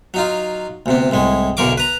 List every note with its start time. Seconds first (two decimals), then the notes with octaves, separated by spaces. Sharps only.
0.14 F#3 D#4 F4
0.86 D2 C3 B3
1.11 C2 A2 G#3
1.57 B1 E2 D3 A#4 C#6 D6
1.78 B4 A#5